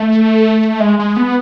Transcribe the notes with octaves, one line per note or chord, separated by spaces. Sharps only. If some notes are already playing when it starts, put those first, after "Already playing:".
Already playing: A3
G#3
G#3
B3